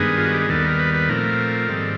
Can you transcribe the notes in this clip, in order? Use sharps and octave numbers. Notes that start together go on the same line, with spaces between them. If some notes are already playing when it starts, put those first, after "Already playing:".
Already playing: G2 D#3 G#3 B3 G#4
F4
F#4
G4
G#4
D#2 D#3 G3 B3 A4
A#4
B4
B4
A#2 F3 A3 C4 A#4
G#2 D#3 G3 C4 A4